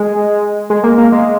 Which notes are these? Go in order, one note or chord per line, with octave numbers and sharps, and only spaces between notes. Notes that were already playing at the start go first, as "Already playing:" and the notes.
Already playing: G#3
G#3
A#3
A#3
G#3